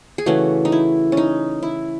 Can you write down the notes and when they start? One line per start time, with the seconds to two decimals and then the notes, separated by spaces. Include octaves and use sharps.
0.18 G#4
0.26 C#3 E3 A3 F#4
0.65 D#4
0.72 E4
1.12 C#4
1.17 D#4
1.63 E4